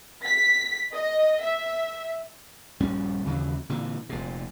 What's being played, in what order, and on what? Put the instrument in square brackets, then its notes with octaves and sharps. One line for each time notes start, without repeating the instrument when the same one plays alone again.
[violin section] B6
D#5
E5
[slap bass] A#1 G2 G3 C#4
D#2 C#3 E3 F#3
A#2 D3 E3
F1 A#2